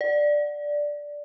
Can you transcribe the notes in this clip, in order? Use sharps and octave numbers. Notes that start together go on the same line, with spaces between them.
D5